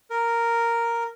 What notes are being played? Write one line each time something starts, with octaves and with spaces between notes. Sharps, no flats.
A#4